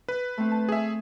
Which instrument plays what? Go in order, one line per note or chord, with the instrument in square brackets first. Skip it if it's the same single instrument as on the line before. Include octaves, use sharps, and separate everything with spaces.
[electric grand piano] B4
[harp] A3 C4
A5
[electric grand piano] G#4 E5